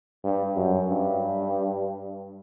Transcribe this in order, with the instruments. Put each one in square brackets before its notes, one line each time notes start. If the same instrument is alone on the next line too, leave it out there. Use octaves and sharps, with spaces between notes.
[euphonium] G2
F#2
G2